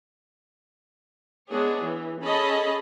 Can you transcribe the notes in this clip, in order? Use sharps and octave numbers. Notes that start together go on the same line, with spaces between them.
G#3 B3 D4 G#4 C#5
E3
C#4 G#4 A4 D#5 A5 B5